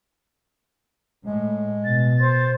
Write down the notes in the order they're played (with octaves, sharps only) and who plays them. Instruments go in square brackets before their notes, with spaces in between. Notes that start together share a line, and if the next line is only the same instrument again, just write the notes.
[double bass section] A2 [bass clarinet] G#3
[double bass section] B2 [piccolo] A6
[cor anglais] C5